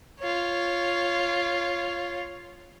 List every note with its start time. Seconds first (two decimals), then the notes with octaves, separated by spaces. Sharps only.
0.19 F4 C#5